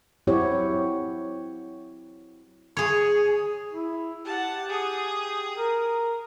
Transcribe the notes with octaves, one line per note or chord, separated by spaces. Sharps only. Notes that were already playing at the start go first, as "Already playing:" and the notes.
F#3 C4 E4 F#4 G4 C#5
G#4 C#5
E4
G4 F#5 A5
G#4 D#6
A#4